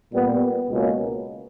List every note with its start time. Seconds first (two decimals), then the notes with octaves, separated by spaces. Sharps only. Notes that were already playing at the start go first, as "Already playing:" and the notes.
0.13 A#2 G3 B3
0.69 C#2 B2 A#3 C#4